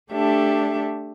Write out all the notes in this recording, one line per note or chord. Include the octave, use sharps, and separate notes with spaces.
A3 D4 G4 A4 E5